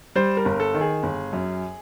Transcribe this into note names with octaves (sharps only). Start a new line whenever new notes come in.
G3 C5
A#4
G1
A4
D#3
G#4
G1
F#2